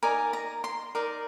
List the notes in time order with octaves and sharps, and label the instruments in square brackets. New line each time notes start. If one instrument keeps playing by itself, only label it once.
[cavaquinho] D#4 A#4 D5 G#5
A#5
C6
D#4 A#4 D5